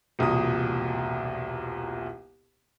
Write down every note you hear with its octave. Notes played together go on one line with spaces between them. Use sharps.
E1 C2 A#2 D#6